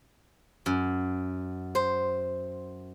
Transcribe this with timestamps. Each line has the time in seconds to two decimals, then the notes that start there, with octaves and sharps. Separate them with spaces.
0.66 F#2
1.75 C5